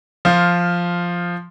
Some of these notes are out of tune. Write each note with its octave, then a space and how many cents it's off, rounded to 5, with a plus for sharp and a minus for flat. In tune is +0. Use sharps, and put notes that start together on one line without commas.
F3 +0 F4 +0